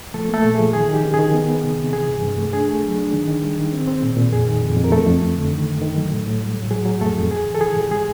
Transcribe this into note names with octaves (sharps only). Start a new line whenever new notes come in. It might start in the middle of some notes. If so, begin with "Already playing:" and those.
F3 A3 A4
A3 A#3 A4
A#2
G#4
F3
D#3 G#4
D#3
G4
C#4
D#3 G#4
B3
B3
C3
C3
E3 G#4
G2
G2
A3
D4 G#4
A3
F#3
D4
D#3
D#3
G3
D#3
C4
C4
A#2
A#2
F2 G#4
D#3
F2
F2
A#4
F2 A3 A4
F2
F2
D3
D#3
F#2
D#3
F#3
A2
A2
G3
A2
F#3 G#4
F#3
F2 A3 A4
F2
G#2 G#4
E3
A4
E3 G#4
G#2 G4
G#3 G#4